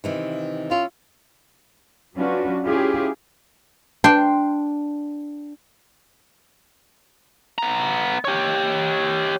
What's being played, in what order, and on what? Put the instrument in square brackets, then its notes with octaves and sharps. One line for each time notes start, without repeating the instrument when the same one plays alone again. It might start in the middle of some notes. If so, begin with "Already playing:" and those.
[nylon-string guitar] C3 D#3 E3
[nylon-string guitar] C#4 E4 [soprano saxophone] F4
[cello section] F#3 C#4 D4 F4 F#4 B4
C#4 E4 F4 G4 G#4
[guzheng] D4 G5 C6
[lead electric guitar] B3 A#5
G4 C#5